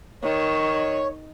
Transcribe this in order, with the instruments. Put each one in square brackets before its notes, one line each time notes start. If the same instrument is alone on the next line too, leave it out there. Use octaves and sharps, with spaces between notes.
[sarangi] D#3 [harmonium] C#5